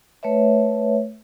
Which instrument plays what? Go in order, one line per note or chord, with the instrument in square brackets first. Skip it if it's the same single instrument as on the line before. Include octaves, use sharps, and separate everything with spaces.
[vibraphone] A3 B4 C#5 E5